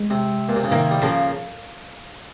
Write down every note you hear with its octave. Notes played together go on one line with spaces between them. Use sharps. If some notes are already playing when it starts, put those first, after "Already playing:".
Already playing: G#3
C3
A#2
C3
C#3
C3 D#3 A#3
G3
C#3 F3 A#3